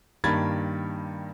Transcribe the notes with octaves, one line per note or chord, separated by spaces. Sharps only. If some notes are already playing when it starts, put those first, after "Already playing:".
G2 D#3 A#3 B5 G#6 A6